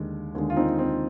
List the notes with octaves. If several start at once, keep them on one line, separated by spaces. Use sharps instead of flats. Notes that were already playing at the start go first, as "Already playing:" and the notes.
Already playing: D#2 D3 G#3
D#2 D3 G#3
F4
C4 D#4
C4